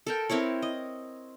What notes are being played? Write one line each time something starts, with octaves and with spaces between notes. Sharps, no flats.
A4 A#4 G5
C4 E4 A#4 C#5
D#5